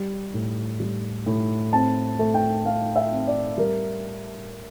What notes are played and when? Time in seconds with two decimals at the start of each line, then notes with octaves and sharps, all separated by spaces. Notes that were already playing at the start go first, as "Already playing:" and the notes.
Already playing: G3
0.34 A2
0.80 G3
1.26 A2
1.72 C4 A5
2.19 A3
2.34 G5
2.65 A3 F5
2.96 E5
3.11 C4
3.27 D5
3.58 G3 A#4